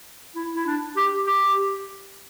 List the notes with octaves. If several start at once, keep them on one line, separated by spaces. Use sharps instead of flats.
E4
E4
D4
G4
G4